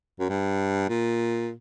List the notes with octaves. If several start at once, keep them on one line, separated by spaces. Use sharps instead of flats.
F#2
G2
A#2